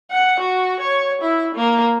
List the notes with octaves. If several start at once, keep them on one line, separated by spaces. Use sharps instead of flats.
F#5
F#4
C#5
E4
A#3